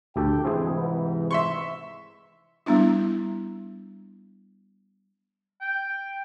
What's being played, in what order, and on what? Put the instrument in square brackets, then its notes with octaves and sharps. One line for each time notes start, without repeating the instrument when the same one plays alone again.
[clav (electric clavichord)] D2 G4 A4 [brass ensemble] G5
[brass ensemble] G#2 C3 E3 [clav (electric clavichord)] C4 E4 G#4
[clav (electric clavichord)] B4 F#5
[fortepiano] E5 C6 C#6
[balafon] G3 B3 D4 E4
[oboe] G5